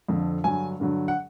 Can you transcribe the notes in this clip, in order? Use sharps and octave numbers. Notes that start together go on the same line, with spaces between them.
F2 D3 F3
G2 D3 F#3 G#5
G2 D3 F#3
F#5